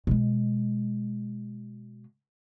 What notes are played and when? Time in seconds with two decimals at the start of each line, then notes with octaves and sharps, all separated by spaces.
0.07 B2 G#3